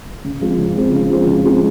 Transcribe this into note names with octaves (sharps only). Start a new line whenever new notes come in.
C#3
F3 G#3 C4
C#3
F3 G#3 C4
C#3
F3 G#3 C4
C#3
F3 G#3 C4